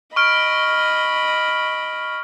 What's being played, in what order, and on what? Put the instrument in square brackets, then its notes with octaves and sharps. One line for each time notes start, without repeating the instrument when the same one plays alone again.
[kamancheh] D#5 B5 [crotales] C#6 F6 D7